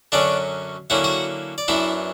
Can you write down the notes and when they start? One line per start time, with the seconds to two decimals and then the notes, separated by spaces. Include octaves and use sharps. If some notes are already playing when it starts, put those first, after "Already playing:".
0.12 F#2 D3 F#3 C#4 D4 D5
0.90 D3 F#3 A#3 C#4 E4 F#5
1.04 F#4 F#5
1.58 D5
1.68 F#2 E3 B3 D4 E4 E5